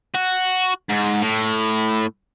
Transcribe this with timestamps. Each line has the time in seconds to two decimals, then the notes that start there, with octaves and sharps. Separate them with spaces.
0.14 F#4
0.90 G#2
1.22 A2